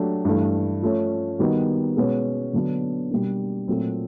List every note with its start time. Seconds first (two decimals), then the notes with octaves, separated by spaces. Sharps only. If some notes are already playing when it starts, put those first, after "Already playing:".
Already playing: F#3 A3 D4 G4
0.25 G2 E3 A3
0.82 F3 A3 C#4
1.39 D#3 G3 B3 D#4 F#4
1.97 B2 G#3 C#4 F#4 B4
2.53 D3 F#3 B3 D4
3.10 B2 G3 A#3 D4
3.68 A#2 F#3 A3 C4